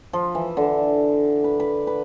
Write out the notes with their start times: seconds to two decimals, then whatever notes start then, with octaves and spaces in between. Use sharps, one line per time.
0.13 F3
0.35 E3
0.57 D3
1.44 B4
1.60 B4
1.87 B4